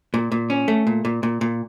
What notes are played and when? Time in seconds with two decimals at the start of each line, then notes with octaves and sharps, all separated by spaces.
0.14 A#2
0.32 A#2
0.50 C#4
0.68 A3
0.87 A#2
1.05 A#2
1.23 A#2
1.41 A#2